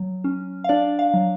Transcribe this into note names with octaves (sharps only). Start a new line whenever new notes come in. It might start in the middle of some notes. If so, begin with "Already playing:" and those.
Already playing: F#3
C#4
F5
D4 D5
F5
F#3